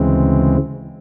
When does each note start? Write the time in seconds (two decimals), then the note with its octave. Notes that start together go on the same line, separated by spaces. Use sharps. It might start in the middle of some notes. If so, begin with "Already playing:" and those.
Already playing: D2 C#3 E3 G#3 C4